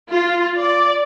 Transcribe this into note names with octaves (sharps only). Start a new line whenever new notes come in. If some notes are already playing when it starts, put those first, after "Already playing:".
F4
D5